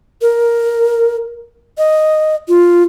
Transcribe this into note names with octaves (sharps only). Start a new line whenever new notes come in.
A#4
D#5
F4